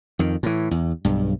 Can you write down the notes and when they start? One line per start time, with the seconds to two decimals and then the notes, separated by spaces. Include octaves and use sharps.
0.19 F2 D#3
0.43 A2 E3
0.71 E2
1.05 B1 G2